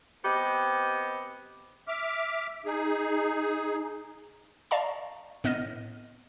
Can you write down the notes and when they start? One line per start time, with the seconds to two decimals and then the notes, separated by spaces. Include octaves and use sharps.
0.24 B3 C4 G4 D#5
1.88 E5 D6 F6
2.65 D#4 G#4
4.71 D5 D#5 F5 A5 A#5 C#6
5.44 A2 B3 D#5 F6 A#6 D#7